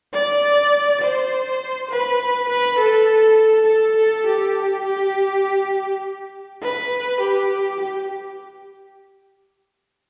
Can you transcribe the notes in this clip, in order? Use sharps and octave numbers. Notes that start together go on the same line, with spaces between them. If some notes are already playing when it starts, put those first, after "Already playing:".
D5
C5
B4
B4
A4
A4
A4
G4
G4
B4
G4
G4